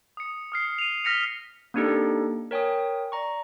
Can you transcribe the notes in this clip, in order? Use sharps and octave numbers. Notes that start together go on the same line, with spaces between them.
D#6 C#7
D#6 F6 C7
D#7 F7
F6 A#6 B6 C#7 F7
A#3 C4 D4 D#4 G4 A4
A#4 C#5 G5 G#5 D#6
D5 A#5 C#6